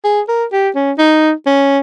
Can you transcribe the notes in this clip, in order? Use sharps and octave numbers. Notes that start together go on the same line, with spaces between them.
G#4
A#4
G4
C#4
D#4
C#4